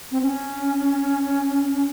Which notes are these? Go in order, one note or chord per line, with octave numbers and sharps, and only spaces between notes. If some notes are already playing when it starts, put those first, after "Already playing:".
C4
C#4